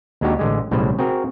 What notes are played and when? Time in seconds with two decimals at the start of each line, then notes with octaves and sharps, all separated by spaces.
0.21 D#2 G#3 D4 F#4 G4 A#5
0.39 A1 D3 G#3
0.71 B1 A2 C#3 G3 B4 C5
0.99 C4 F#4 G#4 A#4